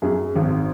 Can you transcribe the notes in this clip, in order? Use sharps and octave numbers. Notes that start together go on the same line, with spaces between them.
F#2 G#4
G#1